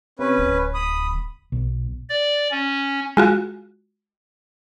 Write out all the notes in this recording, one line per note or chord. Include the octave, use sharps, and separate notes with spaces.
C3 C#4 B4
D1
B5 D#6
B1
D5
C#4
G#3 F4 F#4